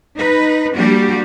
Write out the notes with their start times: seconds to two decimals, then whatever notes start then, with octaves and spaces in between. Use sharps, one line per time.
0.15 D#4 B4
0.75 G3 A#3 D4 F#4 G4